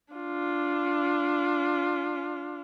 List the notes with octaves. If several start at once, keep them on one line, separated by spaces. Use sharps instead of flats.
D4 F4